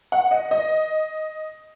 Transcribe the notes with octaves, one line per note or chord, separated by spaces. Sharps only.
F#5
D#5
D#5